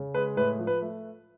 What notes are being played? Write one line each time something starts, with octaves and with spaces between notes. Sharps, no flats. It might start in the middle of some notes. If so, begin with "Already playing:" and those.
Already playing: C#3
G#3 B4
A2 B4
F3
B4
A3